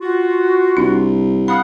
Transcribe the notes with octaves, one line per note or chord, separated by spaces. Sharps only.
F4 F#4
C2 D4
F5 F#5 B5 D#6